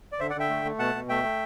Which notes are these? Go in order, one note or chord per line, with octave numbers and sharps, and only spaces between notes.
D5
D3 C5 E5
D5 F#5
D3 E5 G5
A3
A3
B2 F#5 A5
B2
A3 E5 G5
A3